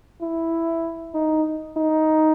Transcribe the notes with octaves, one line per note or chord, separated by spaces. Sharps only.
E4
D#4
D#4